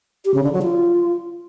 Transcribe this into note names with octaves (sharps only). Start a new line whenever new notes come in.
G4
C#3
D3
F#3
F4